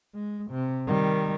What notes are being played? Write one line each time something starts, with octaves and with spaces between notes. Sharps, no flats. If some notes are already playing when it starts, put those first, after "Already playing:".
G#3
C3
D#3 G3